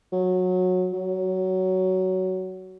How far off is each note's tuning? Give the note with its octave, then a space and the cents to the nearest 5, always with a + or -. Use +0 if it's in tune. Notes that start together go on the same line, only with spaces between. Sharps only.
F#3 -20
F#3 +15